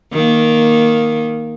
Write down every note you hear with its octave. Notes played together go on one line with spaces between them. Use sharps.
D#3 A#3